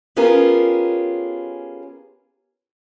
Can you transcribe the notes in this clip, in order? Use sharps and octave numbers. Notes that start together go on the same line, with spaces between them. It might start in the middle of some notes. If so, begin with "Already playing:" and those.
B3 C#4 F4 G4 G#4 A#4